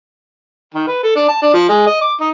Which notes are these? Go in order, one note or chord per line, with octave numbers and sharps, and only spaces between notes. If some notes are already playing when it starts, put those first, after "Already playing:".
D#3
B4
A4
D4
A5
D4
F3
G#3
D#5
D6
D#4